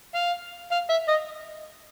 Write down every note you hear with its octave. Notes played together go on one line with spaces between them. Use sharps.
F5
F5
E5
D#5